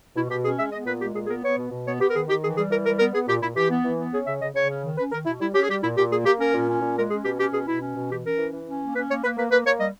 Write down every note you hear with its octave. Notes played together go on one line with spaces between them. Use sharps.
B2 E4
B2 G4
C#4 G#4
G#3 E5
B3 D#5
A#2 B4
G#3 G4
A#2 G#4
G#4
B3 A#4
B3 C#5
B2
B2
B3 C#5
B3 G4
A#4
D#3 G#4
D#3 G4
E3 G#4
G3 G#4
E3 A#4
G3 A#4
B3 A#4
B3 G#4
A#2 G4
A#2 E4
E3 G4
B3
E3
B3
C#4 G#4
C#3 E5
C#3 D#5
C#3 C#5
C#4
D#3
C#4 B4
D#3 A#4
B2 E4
G3 E4
C#4 G4
G#4
G3 G4
A#2 E4
A#2 G4
A#3 G#4
A#3 G4
C#4 A#4
A#2
C#4
A#2
G#3 A#4
C#4 G#4
B2 G4
C#4 G4
B2 G#4
B2 E4
C#4
B2
E3 G4
C#4 A#4
E3
E3
C#4
A#3
C#4 B4
A#3 C#5
A#3 B4
A#3 B4
A#3 B4
A#3 C#5
G3 D#5